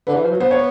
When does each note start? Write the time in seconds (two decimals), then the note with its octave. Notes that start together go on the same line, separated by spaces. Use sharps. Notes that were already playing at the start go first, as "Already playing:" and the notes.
0.07 D3 B4
0.15 E3
0.24 F3
0.31 F#3
0.40 B3 C5
0.51 C#5